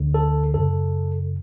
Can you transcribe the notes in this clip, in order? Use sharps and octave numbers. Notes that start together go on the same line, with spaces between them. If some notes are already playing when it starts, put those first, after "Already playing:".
Already playing: D2 D3
A4
F#2 C#3 A4